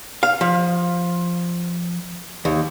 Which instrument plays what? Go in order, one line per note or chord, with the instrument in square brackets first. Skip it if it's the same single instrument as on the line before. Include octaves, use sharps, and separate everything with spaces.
[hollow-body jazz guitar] F5
F3
D#2